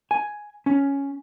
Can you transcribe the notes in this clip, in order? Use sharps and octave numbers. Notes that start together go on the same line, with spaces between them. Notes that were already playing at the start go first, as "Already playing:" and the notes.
G#5
C#4